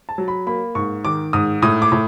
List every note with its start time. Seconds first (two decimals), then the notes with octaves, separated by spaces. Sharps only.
0.09 A5
0.18 F#3
0.28 B5
0.47 A#3 B5
0.75 G#2 C#6
1.05 D#3 D6
1.33 G#2 D#6
1.62 A2 D#6
1.82 D6
1.92 A2